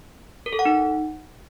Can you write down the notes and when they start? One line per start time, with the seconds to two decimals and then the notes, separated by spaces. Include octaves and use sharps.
0.46 A#4
0.53 A4
0.59 F#5
0.65 D#4